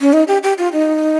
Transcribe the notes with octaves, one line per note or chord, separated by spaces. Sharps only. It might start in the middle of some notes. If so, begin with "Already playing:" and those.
C#4
D#4
G4
G4
F4
D#4